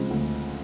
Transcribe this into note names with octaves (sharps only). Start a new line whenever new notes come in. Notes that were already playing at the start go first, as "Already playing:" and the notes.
Already playing: D2 C#3 F3 G#3 C4
D2